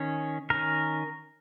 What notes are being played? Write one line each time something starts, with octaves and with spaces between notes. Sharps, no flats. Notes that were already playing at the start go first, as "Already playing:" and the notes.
Already playing: D#3 C#4
D#3 C#4 A#4